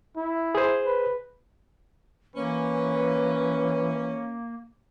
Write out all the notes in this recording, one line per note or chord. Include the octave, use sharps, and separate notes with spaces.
E4
G#4 C5
B4
E3 A#3 C#4 B4